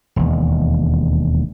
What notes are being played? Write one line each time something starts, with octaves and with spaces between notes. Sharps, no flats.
E1 D#2